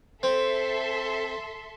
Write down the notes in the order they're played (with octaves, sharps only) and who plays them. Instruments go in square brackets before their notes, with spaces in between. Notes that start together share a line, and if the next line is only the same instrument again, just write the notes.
[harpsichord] C4 [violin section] A4 E5 C6